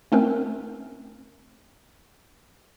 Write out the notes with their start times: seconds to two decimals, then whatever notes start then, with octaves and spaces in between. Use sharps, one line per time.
0.12 A3 C4 C#4 A#4